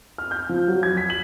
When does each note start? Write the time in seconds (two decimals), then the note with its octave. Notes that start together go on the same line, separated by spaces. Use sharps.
0.18 F6
0.31 G6
0.49 F3
0.68 F#3
0.83 G#6
0.97 B6
1.10 F#7